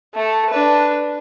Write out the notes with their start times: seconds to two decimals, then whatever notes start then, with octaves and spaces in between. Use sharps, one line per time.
0.15 A3 A4
0.50 D4 B4